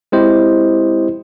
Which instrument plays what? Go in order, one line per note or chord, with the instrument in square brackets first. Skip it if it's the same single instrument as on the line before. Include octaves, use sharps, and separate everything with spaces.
[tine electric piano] G#3 C4 E4 G4 C5 D#5